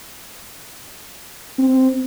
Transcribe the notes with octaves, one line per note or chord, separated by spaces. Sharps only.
C4